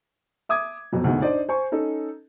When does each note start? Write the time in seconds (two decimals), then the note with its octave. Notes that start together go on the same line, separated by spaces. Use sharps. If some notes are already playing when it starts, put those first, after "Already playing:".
0.49 E5 D6 D#6 G#6
0.92 F2 B2 F#3
1.04 D2 G#2 B2
1.22 D4 D#4 C5 D5 D#5
1.49 C5 G#5 C#6
1.72 C#4 D#4 A4